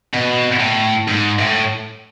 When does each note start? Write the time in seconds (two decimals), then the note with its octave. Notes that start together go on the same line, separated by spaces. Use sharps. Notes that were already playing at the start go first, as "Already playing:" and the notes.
0.14 B2
0.60 A2
1.08 G#2
1.39 A2